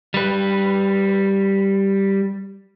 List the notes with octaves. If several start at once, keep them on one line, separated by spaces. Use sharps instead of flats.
G3 B4